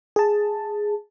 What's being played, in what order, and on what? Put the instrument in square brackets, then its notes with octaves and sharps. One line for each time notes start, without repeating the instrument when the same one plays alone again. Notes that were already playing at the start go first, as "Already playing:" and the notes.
[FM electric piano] G#4 A5